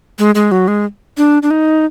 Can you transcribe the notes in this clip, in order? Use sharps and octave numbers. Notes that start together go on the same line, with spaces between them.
G#3
G#3
F#3
G#3
D4
D4
D#4